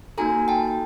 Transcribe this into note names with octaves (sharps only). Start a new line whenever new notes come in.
A#3 D#4 F#4 A4 G#5 A#5
G5 A5